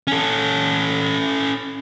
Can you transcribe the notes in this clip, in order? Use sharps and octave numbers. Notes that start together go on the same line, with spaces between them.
C#4 A4